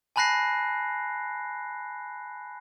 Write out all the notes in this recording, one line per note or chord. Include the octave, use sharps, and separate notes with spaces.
G#5 A5 B5 F#6 A#6 C7